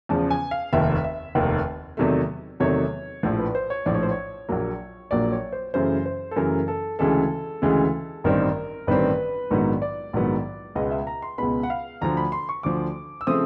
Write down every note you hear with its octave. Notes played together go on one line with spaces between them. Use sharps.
E2 C#3 F3 A5
G#5
F5
F1 D#2 D#3 E5
E5
F1 D#2 D#3
E2 C3 D#3 F#3 A3
E2 C3 D#3 F#3 A3 C#5
A#1 A2 F3 C5
B4
C5
C#5
A#1 A2 F3 D5
C#5
C5
C#5
A#1 A#2 F#3 A#3
A#1 A#2 F#3 A#3 D5
C#5
C5
F#2 C#3 E3 A3 C5
C5
A4
F#2 C#3 E3 A3 A#4
A4
D2 C#3 E3 G#3 A4
D2 C#3 E3 G#3
A1 G2 D#3 G3 C4 A#4
A1 G2 D#3 G3 C4 B4
A#1 G#2 D#3 F#3 B3
D5
A#1 G#2 D#3 F#3 B3
C#2 B2 G#3 B3 D#5
E5
A#5
C6
C#2 B2 G#3 B3 B5
F#5
F5
D2 D3 F3 A#5
B5
C6
C#6
D2 D3 F3 D6
E6
C#3 F3 A3 C4 D#6